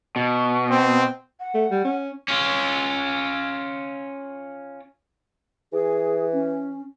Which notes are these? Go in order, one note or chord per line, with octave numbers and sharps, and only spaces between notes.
B2
C4
F#5
A3
G3
C#4
C#4 F4
E3 G#4
C#4